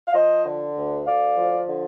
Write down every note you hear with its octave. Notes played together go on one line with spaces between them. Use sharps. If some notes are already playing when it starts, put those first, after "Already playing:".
F5
F3 C5 D#5
D3
D2
D2 D5 F5
F3
D3